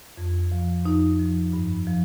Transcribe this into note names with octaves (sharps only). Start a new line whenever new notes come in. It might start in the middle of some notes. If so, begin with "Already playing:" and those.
F2
F3
F2 D#4
F3
G2
F3